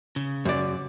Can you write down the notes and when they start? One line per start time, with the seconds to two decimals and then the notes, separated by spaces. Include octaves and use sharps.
0.16 C#3
0.45 F#2 D5